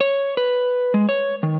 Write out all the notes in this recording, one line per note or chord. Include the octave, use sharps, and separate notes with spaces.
C#5
B4
G#3
C#5
D#3